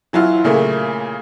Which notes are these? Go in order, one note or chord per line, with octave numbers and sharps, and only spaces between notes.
E3 F#3 E4 F4
A#2 C#3 A3 A#3